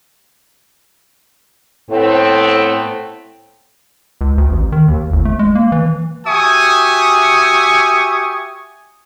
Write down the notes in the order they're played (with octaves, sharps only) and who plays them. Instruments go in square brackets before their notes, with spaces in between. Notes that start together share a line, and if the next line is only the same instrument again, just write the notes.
[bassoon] A2 [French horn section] A3 B3 C4
[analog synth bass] C#2
D2
A1
D#3
D#2
G1
A3
G#3
A#3
E3
[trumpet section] F#4 G4 E5 G#5 C#6 D#6